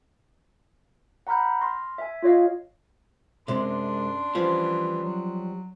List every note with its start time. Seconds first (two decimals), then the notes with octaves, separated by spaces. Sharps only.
1.27 F#5 A#5 B5 F6 G6
1.61 C6 F6 A#6
1.98 E5 G#5
2.23 F4 C#5 D#5 F5
3.48 F#2 C3 G#3 D4 C6
4.35 E3 F3 G3 C#4
5.03 F#3